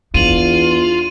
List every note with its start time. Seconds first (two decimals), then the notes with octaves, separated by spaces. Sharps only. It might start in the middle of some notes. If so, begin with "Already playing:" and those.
0.14 E2 D4 F4 D#7 F#7